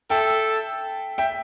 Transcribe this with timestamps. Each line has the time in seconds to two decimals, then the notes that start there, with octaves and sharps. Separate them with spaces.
0.10 A4 E5 G5
1.18 E5 G5